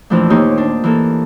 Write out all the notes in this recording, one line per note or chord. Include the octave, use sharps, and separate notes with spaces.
F2 A#2 E3 F3 A3 D4
D#2 A#3 D#4 G4 C#5 C6
D4 C6
E3 A#3 A4